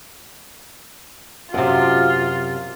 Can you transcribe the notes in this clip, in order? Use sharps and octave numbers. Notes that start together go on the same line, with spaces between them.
F#2 C3 F4